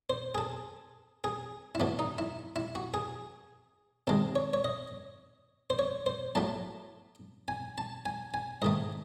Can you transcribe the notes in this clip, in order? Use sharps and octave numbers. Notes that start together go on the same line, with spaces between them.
C5
G#4
A4
G#4
E4
A2 E3 A3 F#4
D#4
E4
E4
F#4
G#4
C3 D#3 G#3 A4
C#5
C#5
D#5
C5
C#5
C5
A2 F#3 A3 A5
G#5
A5
G#5
G#5
G#2 D#3 A3 D#5